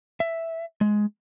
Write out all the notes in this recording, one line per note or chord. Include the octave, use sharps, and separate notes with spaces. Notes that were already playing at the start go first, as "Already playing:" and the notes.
E5
G#3